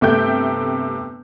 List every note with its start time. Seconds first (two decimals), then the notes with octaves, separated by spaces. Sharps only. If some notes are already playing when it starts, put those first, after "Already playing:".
0.01 G1 C3 A3 E5 G5 G6